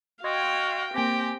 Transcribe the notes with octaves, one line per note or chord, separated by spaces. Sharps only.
F#4 D#5 F5 G5 C6 G#6
A#3 C4 G4 G5 G#5 A#6